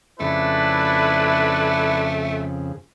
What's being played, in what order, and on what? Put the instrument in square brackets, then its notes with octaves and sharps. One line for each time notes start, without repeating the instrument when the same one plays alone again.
[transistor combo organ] F2 C#3 [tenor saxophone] A3 [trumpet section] D4 E4 B4